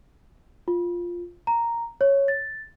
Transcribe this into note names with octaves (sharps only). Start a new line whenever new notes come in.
F4
A#5
C#5
A6